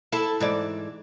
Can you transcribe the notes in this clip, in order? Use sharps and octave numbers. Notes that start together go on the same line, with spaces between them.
E4 A4
G#2 E3 D5